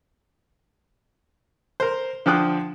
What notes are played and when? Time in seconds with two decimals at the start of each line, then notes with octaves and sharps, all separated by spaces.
1.80 A#4 C5
2.26 D3 F3 G5 D#6 F#6